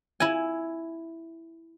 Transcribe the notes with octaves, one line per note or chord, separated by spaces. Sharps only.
E4 G#5